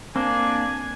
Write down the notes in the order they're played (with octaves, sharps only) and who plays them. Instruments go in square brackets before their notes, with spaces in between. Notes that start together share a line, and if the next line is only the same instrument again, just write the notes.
[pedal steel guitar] A#3 [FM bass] C4 [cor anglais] D4 [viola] G#5